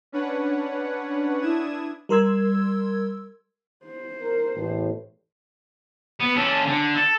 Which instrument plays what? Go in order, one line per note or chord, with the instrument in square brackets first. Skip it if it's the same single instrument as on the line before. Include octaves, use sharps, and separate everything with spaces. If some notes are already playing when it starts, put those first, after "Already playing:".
[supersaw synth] C#4 D4 B4 C#5 F#5
D4 E4 D#6 G#6 E7
[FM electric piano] G3 A#4 C6 E6 G#6
[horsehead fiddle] C5
[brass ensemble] A#4
A1 E2 A2
[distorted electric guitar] B3
C#4 A4
D3
A4